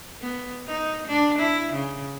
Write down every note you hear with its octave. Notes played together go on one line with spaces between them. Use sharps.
B3
D#4
D4
E4
C#3